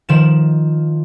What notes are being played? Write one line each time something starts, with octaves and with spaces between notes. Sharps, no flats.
D#3 F3 E7